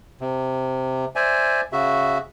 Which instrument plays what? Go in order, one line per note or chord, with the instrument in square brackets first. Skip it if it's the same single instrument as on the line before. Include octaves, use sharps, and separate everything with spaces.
[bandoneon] C3
C5 D5 E5 G#5
C#3 F#4 E5